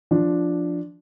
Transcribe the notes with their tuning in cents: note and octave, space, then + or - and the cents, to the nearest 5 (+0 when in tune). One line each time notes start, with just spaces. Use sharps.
F3 +0 D4 +0